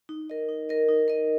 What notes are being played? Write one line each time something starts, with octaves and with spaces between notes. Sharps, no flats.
D#4
A#4 D#5
D#4
A#4 D#5
D#4
A#4 D#5